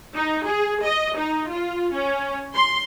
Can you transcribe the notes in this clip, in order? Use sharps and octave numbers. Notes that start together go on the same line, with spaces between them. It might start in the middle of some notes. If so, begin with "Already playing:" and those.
D#4
G#4
D#5
D#4
F4
C#4
C6